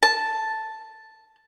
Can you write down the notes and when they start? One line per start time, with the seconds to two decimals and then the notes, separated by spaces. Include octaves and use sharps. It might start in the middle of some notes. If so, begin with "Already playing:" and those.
0.03 A5